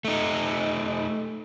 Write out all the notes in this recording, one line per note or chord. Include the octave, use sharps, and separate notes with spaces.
A3 D#4